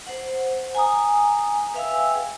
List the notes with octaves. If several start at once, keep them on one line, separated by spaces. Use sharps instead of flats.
C5 F#5
G#5 A#5 D#6
B4 E5 F5 G5 G#5 E6
G#4